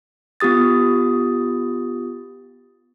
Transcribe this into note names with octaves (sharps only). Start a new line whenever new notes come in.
B3 F4 G4 D#6 A6